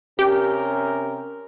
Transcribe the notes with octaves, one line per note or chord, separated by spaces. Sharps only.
C3 C#4 G4 A#4